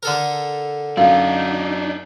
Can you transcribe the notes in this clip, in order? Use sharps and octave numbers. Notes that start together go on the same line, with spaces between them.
D3 A4 A#4
F#2 D4 D#4 F5